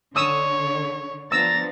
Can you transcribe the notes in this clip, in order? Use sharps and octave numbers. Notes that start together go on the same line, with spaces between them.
D3 C#5 D#6 E6
F3 B3 D4 A#5 E6 A6